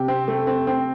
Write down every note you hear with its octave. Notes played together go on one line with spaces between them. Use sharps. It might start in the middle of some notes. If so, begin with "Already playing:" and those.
Already playing: C3 G4
C4
A3
C4
C4